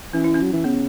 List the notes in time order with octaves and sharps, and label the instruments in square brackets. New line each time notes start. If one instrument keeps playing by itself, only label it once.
[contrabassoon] E3 [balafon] C#4
[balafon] E4
C#4
[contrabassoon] F#3
E3
[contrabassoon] C#3 [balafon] B3